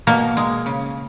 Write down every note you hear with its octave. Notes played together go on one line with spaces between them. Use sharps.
B2 A#3
G#3
C#3